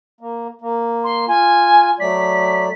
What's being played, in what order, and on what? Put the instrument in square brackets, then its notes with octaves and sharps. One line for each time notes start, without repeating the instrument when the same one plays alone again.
[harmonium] A#3
A#3
[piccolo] C6
[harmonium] F4 [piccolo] G#5
[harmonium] F#3 A3 D5 [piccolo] B6